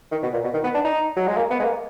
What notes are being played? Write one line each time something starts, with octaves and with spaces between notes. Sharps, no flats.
D#3
B2
A#2
B2
D#3
B3
D4
D#4
F#3
G#3
A#3
B3
G#3
A#3